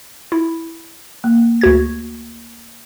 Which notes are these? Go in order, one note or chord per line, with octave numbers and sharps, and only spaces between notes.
E4
A#3
D2 F#4 G#6